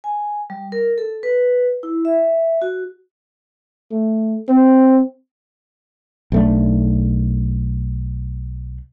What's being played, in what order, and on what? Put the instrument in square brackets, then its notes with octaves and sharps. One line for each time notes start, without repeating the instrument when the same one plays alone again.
[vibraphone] G#5
G3
A#4
A4
B4
E4
E5
F#4
[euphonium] A3
C4
[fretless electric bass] B1 A3 D4